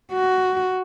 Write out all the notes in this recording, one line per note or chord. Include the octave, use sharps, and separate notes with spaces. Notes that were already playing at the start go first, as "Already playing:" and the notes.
F#4